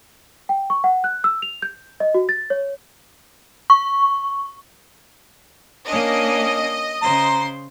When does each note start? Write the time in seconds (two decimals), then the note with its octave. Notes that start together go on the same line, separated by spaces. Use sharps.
0.49 G5
0.70 C#6
0.84 F#5
1.04 F#6
1.24 E6
1.42 F7
1.62 G6
2.00 D#5
2.14 F#4
2.29 A6
2.50 C#5
3.70 C#6
5.87 A#3 C#4 D4 D#5
7.02 C#3 C5 A#5 C6